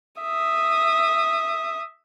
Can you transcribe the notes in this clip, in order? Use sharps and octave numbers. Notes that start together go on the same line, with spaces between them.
E5 D#6